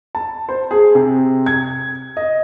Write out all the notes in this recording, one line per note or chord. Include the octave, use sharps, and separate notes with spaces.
A5
C5
G#4
C3
G#6
D#5